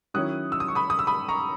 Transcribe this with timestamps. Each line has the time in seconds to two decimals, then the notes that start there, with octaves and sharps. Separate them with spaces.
0.14 D#3 F#3 C#4 E4 D#6 F#6
0.52 E6
0.60 D#6
0.68 C#6
0.75 B5 D#6
0.90 D#6
0.99 E6
1.07 B5 D#6
1.28 A#5 C#6